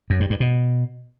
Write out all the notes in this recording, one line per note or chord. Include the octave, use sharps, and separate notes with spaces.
F#2
G2
G2
B2